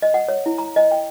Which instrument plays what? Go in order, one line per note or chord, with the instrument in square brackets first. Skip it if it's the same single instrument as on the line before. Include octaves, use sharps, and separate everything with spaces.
[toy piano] D#5
F#5
C#5
E4
A#5
D#5
G5